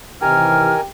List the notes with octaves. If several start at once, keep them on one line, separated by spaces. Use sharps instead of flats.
C3 D#3 E3 G4 A#4 G#5 F6